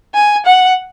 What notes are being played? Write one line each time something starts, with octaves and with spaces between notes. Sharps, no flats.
G#5
F#5